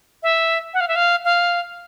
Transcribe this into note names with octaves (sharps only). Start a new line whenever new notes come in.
E5
F#5
F5
E5
F5
F5